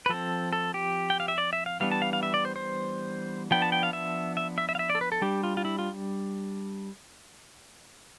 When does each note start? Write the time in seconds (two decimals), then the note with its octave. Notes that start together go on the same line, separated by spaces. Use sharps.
0.06 B4
0.09 F3 C4 A4
0.53 A4
0.74 G4
1.10 G5
1.20 F5
1.28 E5
1.38 D5
1.53 E5
1.66 F5
1.80 E3 G3 B3 D4 F5
1.92 A5
2.02 F5
2.13 F5
2.23 E5
2.34 D5
2.45 C5
2.56 C5
3.51 F3 B3 D4 G5
3.62 A5
3.72 G5
3.83 F5
3.93 E5
4.37 E5
4.58 E5
4.69 E5
4.75 F5
4.79 E5
4.90 D5
4.95 A4
5.01 B4
5.12 A4
5.22 G3 D4 G4
5.44 F4
5.57 F4
5.65 E4
5.79 F4